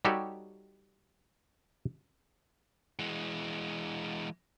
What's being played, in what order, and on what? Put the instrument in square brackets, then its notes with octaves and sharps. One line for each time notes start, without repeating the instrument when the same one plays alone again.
[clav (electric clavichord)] G3 D#4 F#4 G4 A4 C#5
[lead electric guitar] E3 G#3